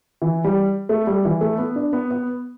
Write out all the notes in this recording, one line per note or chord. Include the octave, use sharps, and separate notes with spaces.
E3
G3
A3
G3
E3
A3
B3
D4
B3
B3